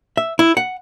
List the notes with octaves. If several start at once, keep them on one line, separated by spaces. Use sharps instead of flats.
E5
E4
F#5